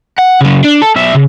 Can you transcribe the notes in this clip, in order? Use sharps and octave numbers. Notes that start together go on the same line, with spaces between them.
F#5
C#3 F#3
D4
A4
B1 E5
C#3